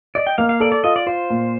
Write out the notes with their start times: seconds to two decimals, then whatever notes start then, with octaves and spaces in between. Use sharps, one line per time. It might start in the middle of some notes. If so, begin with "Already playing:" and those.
0.15 D5 D#5
0.27 G5
0.38 A#3 F5
0.49 F5
0.60 A4 D5
0.72 D5
0.84 F4 D#5
0.96 D5
1.07 F4 C5
1.30 A#2